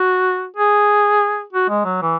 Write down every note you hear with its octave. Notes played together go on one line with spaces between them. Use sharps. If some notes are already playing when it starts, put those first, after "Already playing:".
Already playing: F#4
G#4
F#4
G#3
F#3
E3